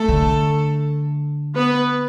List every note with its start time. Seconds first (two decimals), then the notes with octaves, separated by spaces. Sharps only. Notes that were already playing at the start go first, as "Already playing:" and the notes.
Already playing: A3 A4
0.08 D3
1.55 B3 B4